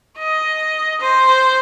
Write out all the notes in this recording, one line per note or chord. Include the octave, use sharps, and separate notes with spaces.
D#5
C5